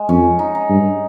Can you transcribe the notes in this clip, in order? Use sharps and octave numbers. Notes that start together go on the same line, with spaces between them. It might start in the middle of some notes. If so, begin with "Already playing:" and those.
Already playing: G#3
F2 C#4
D#4
D#4
G2